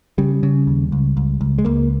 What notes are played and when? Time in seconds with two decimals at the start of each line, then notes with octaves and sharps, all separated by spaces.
0.18 C#3 G3
0.43 C#3
0.67 D#2
0.92 C#2
1.17 C#2
1.41 C#2
1.58 G#3
1.65 C#2 A#3